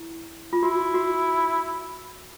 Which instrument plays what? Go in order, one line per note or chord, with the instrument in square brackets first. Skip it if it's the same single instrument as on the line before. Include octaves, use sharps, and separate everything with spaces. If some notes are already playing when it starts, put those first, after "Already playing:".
Already playing: [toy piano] E4
F4
[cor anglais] E4 [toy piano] F#4
[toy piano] F#4